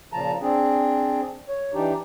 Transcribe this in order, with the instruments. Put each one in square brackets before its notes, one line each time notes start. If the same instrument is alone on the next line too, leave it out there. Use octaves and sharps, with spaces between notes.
[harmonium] A#2 C#3 F3 A5 A#5
C4 D4 G#4
C#5
E3 D4 D#4 G4